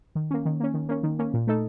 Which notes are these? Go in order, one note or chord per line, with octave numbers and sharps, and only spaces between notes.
D#3
A#3 C#4
D#3
A#3 C#4
D#3
A#3 C#4
D#3
A#3 C#4
A#2
A3 D#4 A4